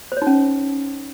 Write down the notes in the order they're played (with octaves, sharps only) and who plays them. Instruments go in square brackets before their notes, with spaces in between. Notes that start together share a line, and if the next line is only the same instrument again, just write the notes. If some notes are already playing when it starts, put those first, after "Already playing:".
[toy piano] C5
C#5
D#4
C#4